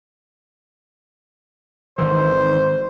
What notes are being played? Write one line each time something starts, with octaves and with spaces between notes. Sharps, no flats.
G#1 D#3 E3 C5